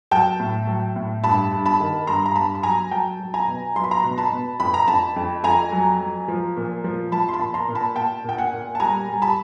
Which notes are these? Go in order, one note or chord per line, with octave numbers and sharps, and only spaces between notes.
F#3 G5 A5
A2
F#3
A2
G2 A5 B5
G2
A5 B5
D#3
G2 A#5 C6
A#5
G2 A5 B5
B5
F#3 G#5 A#5
F#3 G5 A5
F#3
G#5 A#5
B2
F#3 C6
B5
A#5 C6
B2
A5 B5
B2
F2 B5
A#5
F2 A5 B5
F2
F2 G#5 A#5
F#3
F#3
F3
A#2
F3
F3 A5 B5
C6
A5 B5
A#2
A#5 C6
A#2
A5 B5
A#2 G5 A5
A#2 G5
F#5 G#5
A#2
A5
G3 G#5 A#5
G3
A5 B5